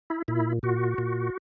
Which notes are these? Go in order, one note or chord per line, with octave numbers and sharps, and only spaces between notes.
E4
A#2 E4
A#2 F#4
A#2